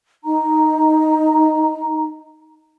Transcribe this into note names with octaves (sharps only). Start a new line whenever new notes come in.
D#4 A#5